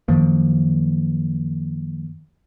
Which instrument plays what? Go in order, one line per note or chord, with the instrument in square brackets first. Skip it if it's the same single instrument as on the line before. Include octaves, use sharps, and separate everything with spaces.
[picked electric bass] F#2 D#3 F3 A#3